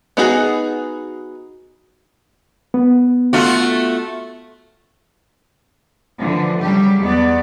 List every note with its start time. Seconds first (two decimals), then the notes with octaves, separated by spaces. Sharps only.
0.17 B3 D#4 F#4 G#4
2.74 B3
3.33 A3 F4 F#4
6.18 D3 E3 F3
6.62 C#3 F#3 G3 G4
7.02 E2 B3 D5